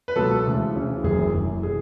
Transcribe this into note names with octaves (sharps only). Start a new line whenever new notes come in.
B4
C#2 B2 F#3 A4
D2 C#3 E3
D2 C#3 E3
F#1 F#2 E3 G#4
F#1 F#2 E3
B2 G#4